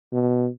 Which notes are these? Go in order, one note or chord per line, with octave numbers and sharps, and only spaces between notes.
B2